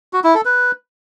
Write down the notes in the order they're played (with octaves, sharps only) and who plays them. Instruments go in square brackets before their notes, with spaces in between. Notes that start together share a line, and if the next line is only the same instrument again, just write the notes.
[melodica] F#4
E4
A4
B4